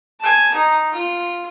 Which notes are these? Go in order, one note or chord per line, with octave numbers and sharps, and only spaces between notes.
G#5 A5
D#4
F4